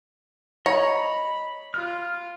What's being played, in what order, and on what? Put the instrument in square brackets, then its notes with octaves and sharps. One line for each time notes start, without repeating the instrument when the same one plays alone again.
[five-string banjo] C#5 [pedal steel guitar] D#5 A#5 [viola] B5
[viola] F4 [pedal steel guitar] F6